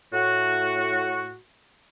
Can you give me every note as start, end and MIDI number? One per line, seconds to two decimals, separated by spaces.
0.13 1.38 45
0.13 1.38 66